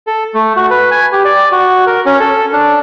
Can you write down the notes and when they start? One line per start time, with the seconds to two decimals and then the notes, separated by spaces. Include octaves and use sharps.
0.07 A4
0.34 A3
0.56 F#4
0.70 B4
0.91 G#5
1.12 G4
1.25 D5
1.52 F#4
1.87 A#4
2.06 C#4
2.20 A4
2.53 D4